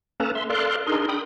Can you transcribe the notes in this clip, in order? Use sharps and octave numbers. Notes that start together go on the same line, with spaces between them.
A#3 C#4 A4 B4 A5 A#5
E5 C6
A4 A#4 D5 F5 C6 F#6
D4 D#4 G#4 A#4 C6
G5 B5 D#6